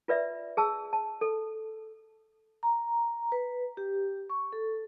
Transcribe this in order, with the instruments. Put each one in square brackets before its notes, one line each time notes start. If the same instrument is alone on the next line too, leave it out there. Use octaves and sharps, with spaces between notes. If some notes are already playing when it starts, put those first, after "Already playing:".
[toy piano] F4 B4 D5 E5
G#4 A5 E6
A5
A4
[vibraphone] A#5
B4
G4
C#6
A4